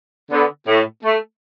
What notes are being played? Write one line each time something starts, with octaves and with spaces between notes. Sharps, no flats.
D3 B3
A2
A3